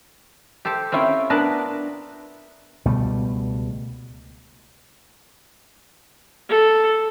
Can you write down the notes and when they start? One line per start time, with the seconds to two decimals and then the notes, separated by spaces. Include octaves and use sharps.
0.65 G4 A4 C5 A5
0.92 C4 C#4 E4 F4 G5
1.30 B3 D4 A#4 B4 A5
2.85 C#2 B2 G3 A3
6.49 A4